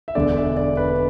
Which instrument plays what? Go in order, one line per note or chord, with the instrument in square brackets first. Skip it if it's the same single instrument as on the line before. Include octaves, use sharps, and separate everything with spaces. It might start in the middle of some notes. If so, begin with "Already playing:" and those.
[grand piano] E5
E1 E2 D3 D5
E5
D5
B4